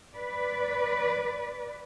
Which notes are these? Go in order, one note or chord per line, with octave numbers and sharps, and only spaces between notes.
B4 D5